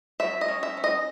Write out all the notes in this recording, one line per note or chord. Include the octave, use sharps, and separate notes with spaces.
F#3 E5
D#5
C#4
E5
C#4
D#5